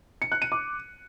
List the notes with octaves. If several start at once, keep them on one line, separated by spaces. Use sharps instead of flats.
C#7
F#6
D#7
D6